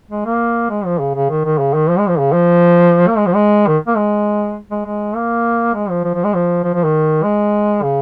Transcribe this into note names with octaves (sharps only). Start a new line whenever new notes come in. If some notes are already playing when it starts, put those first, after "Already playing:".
G#3
A#3
G#3
F3
C#3
C#3
D#3
D#3
C#3
D#3
F3
G#3
F3
C#3
F3
A#3
G#3
F3
G#3
D#3
A#3
G#3
G#3
G#3
A#3
G#3
F3
F3
F3
G#3
F3
F3
F3
D#3
G#3
C#3